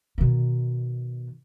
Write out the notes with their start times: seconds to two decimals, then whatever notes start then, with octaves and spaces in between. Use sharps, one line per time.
0.18 B2 D#3